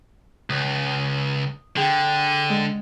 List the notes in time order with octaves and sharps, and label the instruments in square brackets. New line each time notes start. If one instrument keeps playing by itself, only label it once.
[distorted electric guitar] C#2 [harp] D#6
[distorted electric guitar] D3 [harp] G#4 G5
[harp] G#3